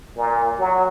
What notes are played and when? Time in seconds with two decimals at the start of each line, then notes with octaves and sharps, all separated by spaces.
0.16 A#2
0.59 F#3